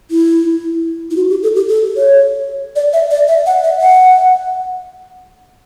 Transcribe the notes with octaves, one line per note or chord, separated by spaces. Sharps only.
E4
E4
F#4
G4
A4
G4
A4
C#5
D5
E5
D5
E5
F#5
E5
F#5